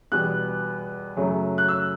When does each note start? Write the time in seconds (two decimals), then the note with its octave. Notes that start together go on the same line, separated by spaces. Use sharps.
0.12 E2 B2 G3 B3 F#6
1.17 F#2 C#3 F#3 A3
1.58 F#6
1.68 E6